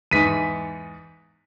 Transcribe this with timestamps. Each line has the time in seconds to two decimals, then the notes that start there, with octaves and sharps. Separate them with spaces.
0.11 E2 G#2 B6 D#7